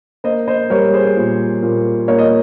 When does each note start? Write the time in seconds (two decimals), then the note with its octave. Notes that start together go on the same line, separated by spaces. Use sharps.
0.24 A#3 C5 D#5
0.48 C5 D#5
0.70 G3 A#4 C#5
0.93 G#4 C5
1.17 A#2
1.63 A#2
2.08 A#3 C#5
2.19 D#5